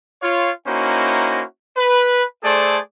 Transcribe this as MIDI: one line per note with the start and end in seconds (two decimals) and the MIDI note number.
0.22 0.50 65
0.22 0.50 73
0.22 0.50 77
0.67 1.43 58
0.67 1.43 61
0.67 1.43 63
0.67 1.43 64
0.67 1.43 66
0.67 1.43 72
1.77 2.23 71
2.43 2.79 57
2.43 2.79 68
2.43 2.79 69
2.43 2.79 72
2.43 2.79 74